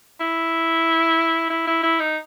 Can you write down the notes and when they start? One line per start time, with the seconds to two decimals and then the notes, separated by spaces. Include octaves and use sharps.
0.21 E4
1.50 E4
1.67 E4
1.83 E4
2.00 D#4